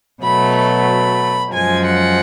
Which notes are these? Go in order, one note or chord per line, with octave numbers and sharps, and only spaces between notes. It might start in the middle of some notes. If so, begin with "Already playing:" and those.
B2 F#3 A3 B5
B5
F#2 F3 G#3 G#5
F#5